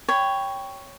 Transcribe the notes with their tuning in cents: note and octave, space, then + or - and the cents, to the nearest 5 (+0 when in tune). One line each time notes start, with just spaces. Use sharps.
C#5 +0 G5 +0 B5 +40